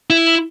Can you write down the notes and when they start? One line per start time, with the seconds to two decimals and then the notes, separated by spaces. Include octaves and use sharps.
0.10 E4